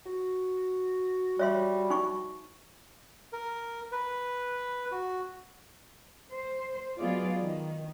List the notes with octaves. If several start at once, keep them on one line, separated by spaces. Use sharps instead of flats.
F#4
G3 C#5 E5 C6
D#4 C#6
A#4
B4
F#4
C5
F#3 G#3 B3 F4 G#4 D5
D#3